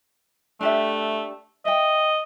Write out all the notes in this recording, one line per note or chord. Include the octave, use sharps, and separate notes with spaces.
A3 D4 G4 E5
D#5 E5 G5